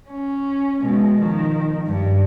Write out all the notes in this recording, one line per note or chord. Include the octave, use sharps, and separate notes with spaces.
C#4
B2 G#3
D#3 F3
G2